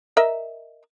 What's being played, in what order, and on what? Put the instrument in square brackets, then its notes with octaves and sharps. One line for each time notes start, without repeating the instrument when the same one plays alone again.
[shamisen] A#4 D#5 E5